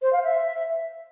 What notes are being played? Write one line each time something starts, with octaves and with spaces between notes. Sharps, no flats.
C5
F5
E5